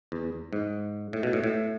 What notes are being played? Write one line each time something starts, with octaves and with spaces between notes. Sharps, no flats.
E2
G#2
A2
B2
A2
A2